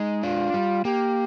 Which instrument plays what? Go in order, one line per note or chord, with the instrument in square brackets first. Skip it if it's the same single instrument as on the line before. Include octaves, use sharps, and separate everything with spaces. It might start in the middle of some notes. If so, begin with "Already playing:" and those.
Already playing: [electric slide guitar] G#3 [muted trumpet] D#4
[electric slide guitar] D4 [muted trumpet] F4
[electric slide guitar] G3
[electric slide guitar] A#3 [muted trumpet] G4